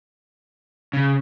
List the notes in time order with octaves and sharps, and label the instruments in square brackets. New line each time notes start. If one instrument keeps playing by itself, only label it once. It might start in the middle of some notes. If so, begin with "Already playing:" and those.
[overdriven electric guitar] C#3